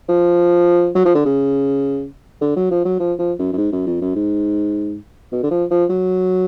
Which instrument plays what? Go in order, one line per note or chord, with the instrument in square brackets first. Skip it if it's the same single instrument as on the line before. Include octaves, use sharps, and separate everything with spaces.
[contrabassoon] F3
F#3
F3
D3
C#3
D3
F#3
F3
F#3
F3
F3
F#2
F#2
G#2
F#2
F2
F#2
G#2
B2
D3
F3
F3
F#3